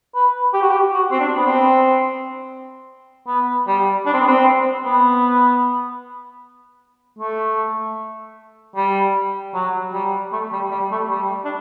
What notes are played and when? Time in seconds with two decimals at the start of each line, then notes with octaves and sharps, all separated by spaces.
0.15 B4
0.53 G4
0.62 F#4
0.69 G4
0.93 F#4
1.11 C4
1.19 D4
1.37 B3
1.45 C4
3.27 B3
3.67 G3
4.06 D4
4.13 C4
4.20 B3
4.28 C4
4.85 B3
7.19 A3
8.76 G3
9.54 F#3
9.93 G3
10.33 A3
10.52 G3
10.71 G3
10.92 A3
11.10 G3
11.45 D4